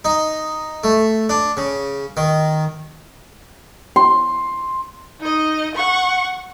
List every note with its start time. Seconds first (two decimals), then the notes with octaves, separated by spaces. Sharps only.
0.05 D#4
0.84 A3
1.29 D4
1.57 C#3
2.17 D#3
3.96 C6
5.20 D#4 D#5
5.75 F#5 C#6